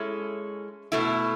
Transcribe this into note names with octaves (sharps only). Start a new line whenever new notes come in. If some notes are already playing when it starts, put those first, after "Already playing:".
Already playing: G#3 C#4 E4 A4
B2 A3 E4